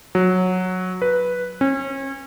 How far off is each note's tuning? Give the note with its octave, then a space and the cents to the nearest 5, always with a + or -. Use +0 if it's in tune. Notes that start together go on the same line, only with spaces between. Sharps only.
F#3 -10
B4 -5
C#4 -35